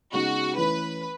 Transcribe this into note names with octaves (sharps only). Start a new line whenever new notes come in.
C#3 G#3 B3 D#4 F#4
E3 A3 C#4 E4 B4